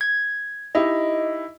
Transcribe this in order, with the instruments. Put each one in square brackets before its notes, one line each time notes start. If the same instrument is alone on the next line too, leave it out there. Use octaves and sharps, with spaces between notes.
[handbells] G#6
[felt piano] D#4 E4 G4 [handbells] D#5